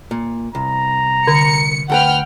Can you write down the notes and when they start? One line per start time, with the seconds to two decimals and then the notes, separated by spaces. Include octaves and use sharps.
0.11 A#2
0.55 C2 A#5
1.27 D3 C#7
1.90 D2 A4 B4 F#5 G5 F6